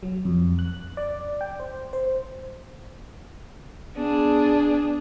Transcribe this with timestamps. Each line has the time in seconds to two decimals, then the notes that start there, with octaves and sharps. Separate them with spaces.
0.03 F#3
0.25 F2
0.59 F#6
0.97 D5
1.41 G5
1.60 C5
1.93 C5
3.96 B3 D4 G#4